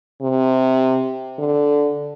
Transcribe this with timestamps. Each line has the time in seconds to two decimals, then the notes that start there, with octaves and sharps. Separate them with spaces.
0.22 C3
1.39 D3